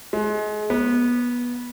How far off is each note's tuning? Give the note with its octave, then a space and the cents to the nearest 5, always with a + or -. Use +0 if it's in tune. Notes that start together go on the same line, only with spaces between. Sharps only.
G#3 +30
B3 -20